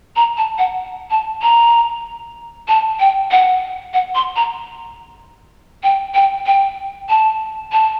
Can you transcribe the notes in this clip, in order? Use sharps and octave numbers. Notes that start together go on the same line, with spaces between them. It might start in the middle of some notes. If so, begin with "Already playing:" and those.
A#5
A5
F#5
A5
A#5
A5
G5
F#5
F#5
C6
A#5
G5
G5
G5
A5
A5